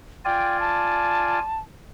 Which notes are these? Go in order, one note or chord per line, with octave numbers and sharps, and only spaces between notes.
F4 D5 G5 G#5
A5